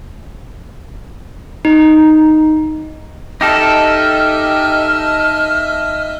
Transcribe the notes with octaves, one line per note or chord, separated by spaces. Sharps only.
D#4
D#4 G4 A4 D#5 E5 F6